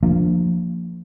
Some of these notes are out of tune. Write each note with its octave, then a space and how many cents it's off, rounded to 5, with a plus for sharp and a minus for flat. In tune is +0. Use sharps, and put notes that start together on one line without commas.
F3 +0 A#3 -20 D4 +0